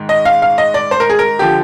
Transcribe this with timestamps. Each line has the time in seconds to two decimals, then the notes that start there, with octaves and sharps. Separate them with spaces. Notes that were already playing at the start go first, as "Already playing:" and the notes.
Already playing: G#2 D#3
0.09 D#5
0.25 F5
0.42 F5
0.58 D#5
0.74 D5
0.91 C5
1.00 A#4
1.10 G#4
1.19 A#4
1.39 D3 F3 G4